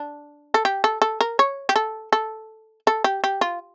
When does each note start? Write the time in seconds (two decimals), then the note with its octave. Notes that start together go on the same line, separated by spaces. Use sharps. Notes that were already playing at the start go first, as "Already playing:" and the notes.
Already playing: D4
0.54 A4
0.65 G4
0.84 A4
1.02 A4
1.21 A#4
1.39 C#5
1.69 G4
1.76 A4
2.13 A4
2.87 A4
3.04 G4
3.24 G4
3.41 F4